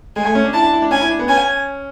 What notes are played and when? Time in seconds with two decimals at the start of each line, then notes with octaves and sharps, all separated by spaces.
0.16 G#3 G#5
0.25 A3
0.35 C#4
0.44 D4
0.54 E4 A5
0.63 D4
0.73 E4
0.82 D4
0.91 C#4 G#5
1.01 E4
1.10 D4
1.19 B3
1.29 C#4 G#5